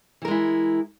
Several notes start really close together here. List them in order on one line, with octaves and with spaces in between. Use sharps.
E3 A#4 G#3 E4